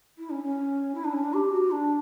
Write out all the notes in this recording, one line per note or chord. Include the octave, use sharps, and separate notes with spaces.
E4
C#4
C#4
E4
D4
C#4
D4
G4
F#4
D4